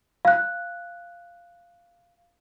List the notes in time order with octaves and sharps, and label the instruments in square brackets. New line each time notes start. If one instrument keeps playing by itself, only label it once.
[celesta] F5 F#6